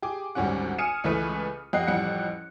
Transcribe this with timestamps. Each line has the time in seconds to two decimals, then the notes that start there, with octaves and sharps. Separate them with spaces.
0.02 G4 G#4 D6
0.35 G#1 D2 G3 C#4 F#5
0.78 G#5 D#6 F6 C#7 D#7 E7
1.04 C#2 E3 A3 B4 D#7
1.73 F2 G4 D#5 F#5 F#6 C7
1.87 A1 F2 G3 G4 F#5 C#7